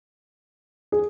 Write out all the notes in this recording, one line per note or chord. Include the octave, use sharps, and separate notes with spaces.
G#4